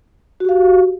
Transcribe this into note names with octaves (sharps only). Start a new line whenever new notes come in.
F#4 G4 F5